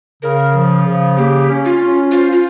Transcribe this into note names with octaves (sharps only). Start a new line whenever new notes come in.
C#3 A#4
F3
C#3
A#3 G4
C#4
F4
C#4
F4 C5
F4